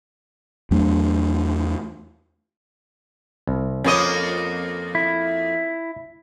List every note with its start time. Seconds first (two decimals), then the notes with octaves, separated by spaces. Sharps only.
0.71 E2 F#3 A3 D4
3.47 C2
3.84 F2 A#3 C#4 D#5
4.95 E4